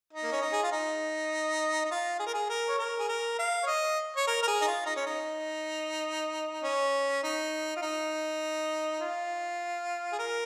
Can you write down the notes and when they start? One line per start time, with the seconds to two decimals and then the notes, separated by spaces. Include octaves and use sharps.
0.13 D#4
0.23 A#3
0.32 C#4
0.42 D#4
0.52 G#4
0.63 F4
0.72 D#4
1.85 D#4
1.91 F4
2.19 G#4
2.26 A#4
2.34 G#4
2.49 A#4
2.68 C#5
2.78 A#4
2.99 G#4
3.08 A#4
3.39 F5
3.63 C#5
3.67 D#5
4.16 C#5
4.27 A#4
4.42 A#4
4.47 G#4
4.62 D#4
4.67 F4
4.86 D#4
4.96 C#4
5.06 D#4
6.64 C#4
7.23 D#4
7.76 F4
7.82 D#4
9.00 F4
10.12 G#4
10.19 A#4